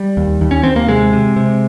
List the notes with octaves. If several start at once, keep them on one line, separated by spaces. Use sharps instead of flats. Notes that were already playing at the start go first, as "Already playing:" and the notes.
Already playing: G3
D#2
D#2
C#4
D#2 C4
A#3
C3 G#3
C3
C3